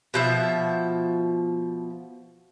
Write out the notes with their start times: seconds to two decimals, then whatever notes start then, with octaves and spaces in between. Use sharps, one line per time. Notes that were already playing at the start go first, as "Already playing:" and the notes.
0.14 B2 F3 E5